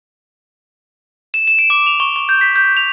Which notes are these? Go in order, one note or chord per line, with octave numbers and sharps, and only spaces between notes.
E7
E7
D7
D6
F7
C#6
C#6
G6
B6
G6
F7